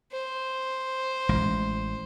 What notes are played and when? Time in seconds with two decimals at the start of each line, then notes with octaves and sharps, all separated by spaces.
0.12 C5
1.29 A1 G#3